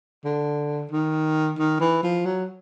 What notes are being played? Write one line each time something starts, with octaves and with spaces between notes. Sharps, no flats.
D3
D#3
D#3
E3
F3
F#3